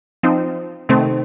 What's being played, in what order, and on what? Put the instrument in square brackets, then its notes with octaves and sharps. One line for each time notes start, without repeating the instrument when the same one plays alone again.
[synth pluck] F3 C4 D#4
C3 D#3 A3 C4